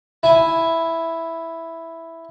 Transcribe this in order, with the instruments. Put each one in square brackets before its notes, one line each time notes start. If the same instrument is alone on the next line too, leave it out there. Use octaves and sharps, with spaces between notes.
[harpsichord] E4 G#5